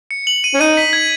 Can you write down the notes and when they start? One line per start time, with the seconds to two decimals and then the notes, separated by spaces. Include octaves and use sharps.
0.11 C#7
0.27 F#7
0.44 D#7
0.54 C#4
0.60 D#4 D#7
0.77 B6
0.93 G#6